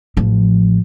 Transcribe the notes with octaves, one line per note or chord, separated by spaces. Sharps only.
A1 F3